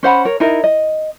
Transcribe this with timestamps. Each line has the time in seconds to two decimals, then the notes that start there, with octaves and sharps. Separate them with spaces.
0.03 C#4 C5 F#5 B5
0.25 A#4 C#5
0.40 D#4 E4 A#4 D#5
0.64 D#5